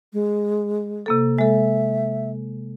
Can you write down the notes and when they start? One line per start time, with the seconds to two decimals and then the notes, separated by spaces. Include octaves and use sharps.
0.13 G#3
1.06 C3 A#3 A4
1.39 G#3 A4 E5